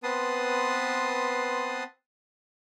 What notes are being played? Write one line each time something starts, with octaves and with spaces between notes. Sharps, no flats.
B3 C4 B4 A5 C6 D#6